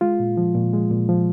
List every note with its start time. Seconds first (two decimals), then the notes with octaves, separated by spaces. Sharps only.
0.01 G#3 F4
0.20 A#2
0.37 F3
0.55 A#2
0.73 G#3
0.91 A#2
1.09 F3